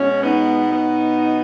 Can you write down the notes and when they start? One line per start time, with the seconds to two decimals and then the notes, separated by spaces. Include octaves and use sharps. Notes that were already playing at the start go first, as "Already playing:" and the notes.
Already playing: B2 G#3 C#4
0.22 B3 D#4
0.70 B2 F#3 B3